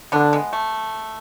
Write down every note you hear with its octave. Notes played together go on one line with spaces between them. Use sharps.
D3 B3 D4
G#3 B3
A3